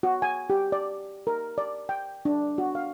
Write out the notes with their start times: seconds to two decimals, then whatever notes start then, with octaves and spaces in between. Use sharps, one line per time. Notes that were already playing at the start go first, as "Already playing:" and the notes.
0.03 F#4
0.22 G#5
0.50 G4
0.72 D5
1.27 A#4
1.58 D5
1.89 G5
2.25 D4
2.58 F#4
2.75 F5